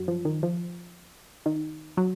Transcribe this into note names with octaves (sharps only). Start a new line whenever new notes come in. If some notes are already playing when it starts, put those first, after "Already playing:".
Already playing: F#2 F#3
F3
D#3
F3
D#3
F#3